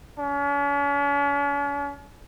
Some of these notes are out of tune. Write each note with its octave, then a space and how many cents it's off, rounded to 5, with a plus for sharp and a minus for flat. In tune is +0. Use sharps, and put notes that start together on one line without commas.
C#4 +45